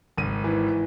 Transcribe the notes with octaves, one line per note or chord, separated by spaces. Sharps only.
G#1 D#7
E3